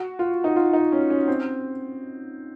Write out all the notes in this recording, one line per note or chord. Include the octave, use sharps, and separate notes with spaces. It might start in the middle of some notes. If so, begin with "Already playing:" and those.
Already playing: F#4
F4
D#4
F4
D#4
C#4
C#4
C4